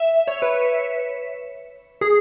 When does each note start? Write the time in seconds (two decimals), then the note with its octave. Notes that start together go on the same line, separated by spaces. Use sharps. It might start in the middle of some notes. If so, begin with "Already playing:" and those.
Already playing: E5
0.27 C#5
0.42 B4
2.01 G#4